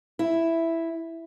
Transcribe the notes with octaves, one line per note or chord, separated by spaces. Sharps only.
E4